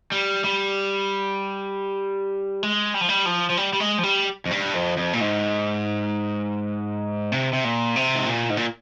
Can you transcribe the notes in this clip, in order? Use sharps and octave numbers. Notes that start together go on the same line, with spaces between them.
G3
G3
G#3
G3
F3
G3
F3
F3
G3
G3
G#3
F3
G3
F2
G2
F2
F2
A#2
G#2
C3
C3
A#2
C3
G#2
A#2
G#2
A#2